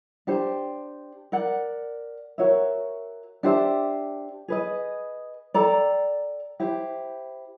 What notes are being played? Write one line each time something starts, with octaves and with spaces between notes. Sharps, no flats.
D4 G4 C5
A#4 D5 F#5
F#4 A#4 C#5 E5
D4 G4 C5 E5
G#4 B4 D#5
A4 D5 G5 A#5
E4 G4 C5